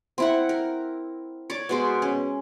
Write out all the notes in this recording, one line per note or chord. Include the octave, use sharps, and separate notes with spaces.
C4 E4 F#5
A#4
C#5 D5 D6
B2 G#3 C5
C#4